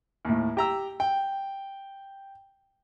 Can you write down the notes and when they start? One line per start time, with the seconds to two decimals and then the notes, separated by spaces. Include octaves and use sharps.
0.25 D#2 A2
0.57 G4 A#5 E6
1.00 G5